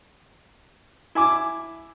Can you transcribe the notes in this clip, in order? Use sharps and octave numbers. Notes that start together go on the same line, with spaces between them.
E4 G#5 D6